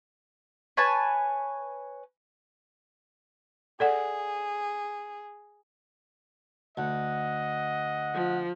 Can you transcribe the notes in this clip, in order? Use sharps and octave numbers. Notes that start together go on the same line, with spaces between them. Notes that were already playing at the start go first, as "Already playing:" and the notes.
B4 C#5 G#5 A5
G#4 A4 D5 F#5
D2 D#5 F#5
F3